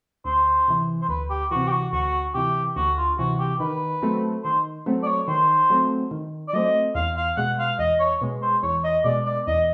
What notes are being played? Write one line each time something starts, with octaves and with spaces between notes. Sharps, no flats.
D2 C5
C3 E3
C5
D2 B4
G4
C3 E3 F#4
G4
F#4
D2 F#4
C3 E3 G4
D2 F#4
F4
C3 E3 F#4
G4
D#3 B4
F#3 A3 C4
D#3 C5
F#3 A3 C4
D5
C#5
D#3 C5
F#3 A3 C4
D#3
D5
F#3 A3 C4 D#5
E2 F5
F5
B2 G#3 F#5
F5
E2 D#5
C#5
B2 G#3
C5
E2 C#5
D#5
B2 G#3 D5
D5
E2 D#5